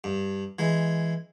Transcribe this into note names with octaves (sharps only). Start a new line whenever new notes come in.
G2
E3 G#3